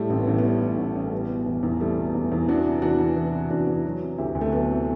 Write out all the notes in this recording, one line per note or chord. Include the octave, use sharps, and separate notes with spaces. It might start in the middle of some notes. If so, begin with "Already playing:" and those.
Already playing: A2 G3 A3
A1 C4
B3
A1 A3
B3
G3
A2
A1
A1
A3
G3 B3
B2
E2
E2
G3 A3 C4
B2
E2
E2
E3 D4 F#4
C3
E2 D4 F#4
E2
E3
C3
E2 D4 F#4
E2
F#3
C3
D2 E4 G4
D2
A3 C4
F#3 B3
C3